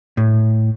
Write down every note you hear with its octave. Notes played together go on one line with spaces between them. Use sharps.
A2